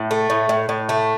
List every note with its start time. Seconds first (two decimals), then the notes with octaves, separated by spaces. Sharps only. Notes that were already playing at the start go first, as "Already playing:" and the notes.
Already playing: A2
0.11 A3
0.30 A2
0.49 A2
0.69 A2
0.89 A3